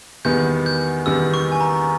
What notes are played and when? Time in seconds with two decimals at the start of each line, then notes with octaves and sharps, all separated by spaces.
0.25 E2 D#3 G3 B3 G6
0.66 G6
1.06 E2 D#3 G3 B3 E6
1.34 C#6
1.52 G#5
1.60 A#5